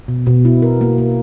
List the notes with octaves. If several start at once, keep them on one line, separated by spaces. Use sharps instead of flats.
B2
B2
E4
A#4
A#3
A#3